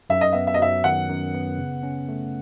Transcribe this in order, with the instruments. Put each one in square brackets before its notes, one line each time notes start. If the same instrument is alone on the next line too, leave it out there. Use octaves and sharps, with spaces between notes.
[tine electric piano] F#2 [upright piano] E5
[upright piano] D#5
[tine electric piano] B3 [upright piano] E5
[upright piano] E5
D#5
[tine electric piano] F#3 [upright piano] E5
[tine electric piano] D#3 [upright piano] F#5
[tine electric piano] F#2
B3
C#3
C#4
A3